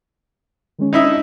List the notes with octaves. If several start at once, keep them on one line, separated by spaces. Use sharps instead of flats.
D#3 G#3 C#4
C#4 D#4 E4 E5 D#6
D4